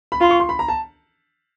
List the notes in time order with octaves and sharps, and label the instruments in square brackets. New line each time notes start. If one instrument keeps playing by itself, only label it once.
[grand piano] B5
[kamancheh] F4 [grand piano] C6
[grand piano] C#6
C6
B5
A#5
A5